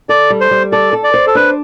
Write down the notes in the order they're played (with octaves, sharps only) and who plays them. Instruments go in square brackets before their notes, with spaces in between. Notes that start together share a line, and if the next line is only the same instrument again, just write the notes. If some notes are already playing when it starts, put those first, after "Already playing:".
[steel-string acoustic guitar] A4 [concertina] D5
[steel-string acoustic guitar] G3
[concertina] C5
[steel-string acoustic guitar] G3
[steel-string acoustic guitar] A4 [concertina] D5
[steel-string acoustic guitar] A4
[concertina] D5
[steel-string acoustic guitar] C5
[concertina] A4
[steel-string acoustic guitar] D4 [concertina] B4